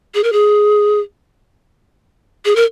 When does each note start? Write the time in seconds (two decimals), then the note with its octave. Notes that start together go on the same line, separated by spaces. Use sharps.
0.15 G#4
0.24 A#4
0.33 G#4
2.45 G#4
2.56 A#4